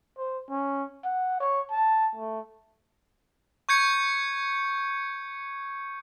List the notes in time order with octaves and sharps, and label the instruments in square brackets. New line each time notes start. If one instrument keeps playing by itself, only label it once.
[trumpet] C5
C#4
F#5
C#5
A5
A3
[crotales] C#6 G6 G#6 C#7